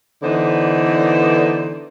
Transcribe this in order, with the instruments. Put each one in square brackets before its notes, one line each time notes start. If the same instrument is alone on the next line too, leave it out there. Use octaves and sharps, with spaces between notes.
[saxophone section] D3 E3 B3 D#4 C5 D5